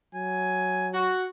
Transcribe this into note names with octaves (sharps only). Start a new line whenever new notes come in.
F#3 G#5
F#4